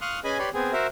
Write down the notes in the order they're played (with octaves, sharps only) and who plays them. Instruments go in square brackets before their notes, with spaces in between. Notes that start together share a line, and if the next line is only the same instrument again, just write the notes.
[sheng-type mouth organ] F5 C6 C#6 D#6 F6 F#6
C#4 G#4 B4 D#5 G#5 B5
G4 B4 C#5 D5 B5 C6
B3 C4 G#4
F#4 A#4 C5 E5